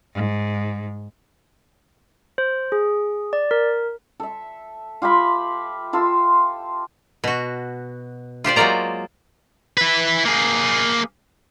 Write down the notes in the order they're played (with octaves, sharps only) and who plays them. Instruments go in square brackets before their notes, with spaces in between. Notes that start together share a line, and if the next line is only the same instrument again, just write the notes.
[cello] G#2
[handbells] C5
G#4
D5
A#4
[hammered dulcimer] A4 E5
F4 G4 E5 B5
F4 A4 C6
[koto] B2 F#4
F4 G4 C5 D5
F#3 G#3 A#3 F4 D5 A#5
[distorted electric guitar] E4 B4
A#3 G#4